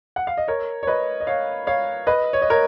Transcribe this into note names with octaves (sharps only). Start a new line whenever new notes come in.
F#5
F5
D#5
A#4 C#5
C#5
B4 D#5
D#5
C#5 F5
C#5 F5
B4 D#5
C#5
D#5
A#4 C#5